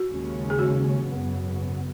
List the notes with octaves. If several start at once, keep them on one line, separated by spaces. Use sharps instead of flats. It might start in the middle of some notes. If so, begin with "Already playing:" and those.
Already playing: F#4
D#2 C#3 G#3 C#4
G#4
F#4
G#1 F#2 C#3 F#3 B3